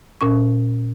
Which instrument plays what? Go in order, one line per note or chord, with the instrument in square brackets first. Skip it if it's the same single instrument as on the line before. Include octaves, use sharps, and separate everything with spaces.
[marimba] A#2 C#4 C#6